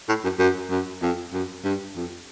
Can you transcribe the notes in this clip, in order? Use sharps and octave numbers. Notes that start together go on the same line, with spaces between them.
A2
F#2
F#2
F#2
F2
F#2
G2
F2